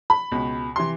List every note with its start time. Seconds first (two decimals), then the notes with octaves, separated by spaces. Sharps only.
0.10 B5
0.32 C#2 B2
0.76 C3 E3 C6